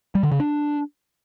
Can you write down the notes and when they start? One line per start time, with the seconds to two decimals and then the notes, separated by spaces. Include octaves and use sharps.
0.15 G3
0.23 D3
0.32 C#3
0.40 D4